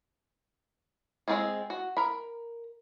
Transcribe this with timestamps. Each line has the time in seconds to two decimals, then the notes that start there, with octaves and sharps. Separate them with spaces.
1.28 G#3 A3 C4 F4 G#4
1.70 F#4
1.97 A#4 B5